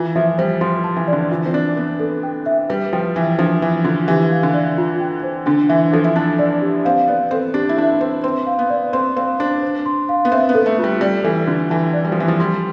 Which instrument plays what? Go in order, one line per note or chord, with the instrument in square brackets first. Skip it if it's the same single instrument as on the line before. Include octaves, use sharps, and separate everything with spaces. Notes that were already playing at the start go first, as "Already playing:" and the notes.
Already playing: [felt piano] E3 [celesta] F4
[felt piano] F3 [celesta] E5
[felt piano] G3 [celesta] C5
[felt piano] F3 [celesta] C6
[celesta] A5
[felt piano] E3
[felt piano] D3 [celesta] D5
[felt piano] E3 [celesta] F4
[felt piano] C4
[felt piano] D4 [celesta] D5
[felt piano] B3 [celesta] B4
[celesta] A4
G5
E5
[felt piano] G3 [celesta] B4
[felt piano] F3 [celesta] G5
[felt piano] E3 [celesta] E5
[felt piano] F3 [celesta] D4
[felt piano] E3 [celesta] B4
[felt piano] D3 [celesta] F4
[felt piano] E3 [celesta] G4
[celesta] F5
[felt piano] D3
[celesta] D5
F4
G5
C5
[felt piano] D3 [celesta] D4
[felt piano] E3 [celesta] E5
[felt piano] F3 [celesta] A4
[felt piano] E4
[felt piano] D4 [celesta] A5
[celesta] D5
G4
[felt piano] C4 [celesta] F5
[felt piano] B3 [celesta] D5
[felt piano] C4 [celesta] A4
[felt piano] D4 [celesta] G4
[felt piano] E4
[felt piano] D4 [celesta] E5
[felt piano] C4 [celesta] B4
[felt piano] C4 [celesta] C6
[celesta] F5
[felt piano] B3
[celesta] D5
[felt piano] C4 [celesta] C6
[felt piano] C4 [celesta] F5
[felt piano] D4 [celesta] C5
[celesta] C5
C6
F5
[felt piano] B3
[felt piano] C4 [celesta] E5
[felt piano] B3
[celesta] A4
[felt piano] A3
[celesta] F4
[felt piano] G3
[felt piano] G3 [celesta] D5
[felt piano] E3 [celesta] A4
[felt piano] D3 [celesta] F4
[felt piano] E3 [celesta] A5
[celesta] D5
[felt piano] G3
F3
[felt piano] E3 [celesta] B4
[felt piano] F3
[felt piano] G3 [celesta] C6